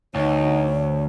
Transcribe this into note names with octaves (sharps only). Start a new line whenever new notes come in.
D2 B2 D#4 C#5